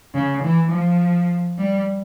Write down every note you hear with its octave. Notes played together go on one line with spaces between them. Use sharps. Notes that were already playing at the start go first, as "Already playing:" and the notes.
C#3
E3
F3
G3